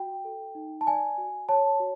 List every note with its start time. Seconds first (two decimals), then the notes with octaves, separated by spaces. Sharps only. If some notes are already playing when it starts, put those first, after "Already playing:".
Already playing: F#4 G5
0.25 A4
0.55 D#4
0.81 A5
0.87 D5 G#5
1.18 F#4
1.49 C#5 A5
1.80 F#4